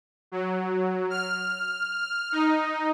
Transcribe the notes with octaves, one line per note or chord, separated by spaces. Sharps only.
F#3
F6
D#4